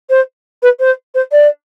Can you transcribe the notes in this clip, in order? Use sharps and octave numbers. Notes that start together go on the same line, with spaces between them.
C5
B4
C5
C5
D5